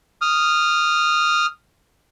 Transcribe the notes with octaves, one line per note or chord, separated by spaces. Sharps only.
D#6 F6